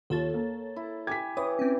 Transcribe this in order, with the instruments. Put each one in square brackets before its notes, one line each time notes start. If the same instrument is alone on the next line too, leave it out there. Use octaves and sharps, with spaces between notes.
[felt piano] D#2 F4 [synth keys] A4 C#5 A6
[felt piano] A#3
[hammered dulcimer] E4
[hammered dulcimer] G4 G#5 [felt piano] G#6 B6
[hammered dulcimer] E3 [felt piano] C#5 [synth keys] D#6
[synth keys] C4 C#4